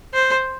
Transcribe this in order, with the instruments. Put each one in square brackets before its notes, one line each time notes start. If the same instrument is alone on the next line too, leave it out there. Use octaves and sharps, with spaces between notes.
[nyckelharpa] C5